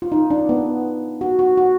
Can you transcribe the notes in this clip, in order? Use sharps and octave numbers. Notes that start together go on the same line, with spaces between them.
F4
D#4
D4
B3
F#4
F#4
F#4